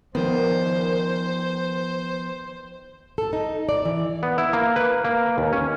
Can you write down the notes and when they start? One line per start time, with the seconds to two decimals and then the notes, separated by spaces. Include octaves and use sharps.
0.15 D#3 F3 B3 C5
3.18 A4
3.33 D#4
3.69 D5
3.85 E3
4.23 B3
4.38 E4
4.53 A#3
4.76 B4
5.05 A#3
5.38 D#2
5.53 C#4